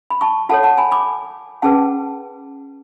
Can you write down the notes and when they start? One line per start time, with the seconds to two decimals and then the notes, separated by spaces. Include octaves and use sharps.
0.10 B5
0.21 A5 C#6
0.49 F4 A4 C#5 F#5 A5
0.63 F#5 A5
0.77 G#5 B5
0.91 B5 D6
1.62 C#4 G#4 B4 F#5 A5